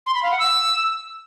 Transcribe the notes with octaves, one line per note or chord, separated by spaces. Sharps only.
C6
B5
F5
F#5
E6